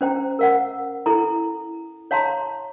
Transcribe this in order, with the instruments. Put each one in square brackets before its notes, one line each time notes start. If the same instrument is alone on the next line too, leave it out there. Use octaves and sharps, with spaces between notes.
[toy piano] C#4 C5 G5 A#5
A#4 F5 F#5
E4 A4 A#5
C#5 F5 A5 A#5 C6